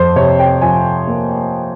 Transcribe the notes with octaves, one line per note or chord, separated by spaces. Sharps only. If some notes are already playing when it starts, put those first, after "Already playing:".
Already playing: F2 C5
C3 C#5
G5
F3 G#5
A#3